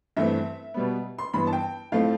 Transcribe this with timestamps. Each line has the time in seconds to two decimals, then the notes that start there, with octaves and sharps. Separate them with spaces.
0.17 G2 E3 A3 C4 E5
0.74 B2 G3 B3
1.18 C6
1.34 G2 E3 B3 B5
1.47 A5
1.53 G5
1.92 A2 F3 A3 C4 F5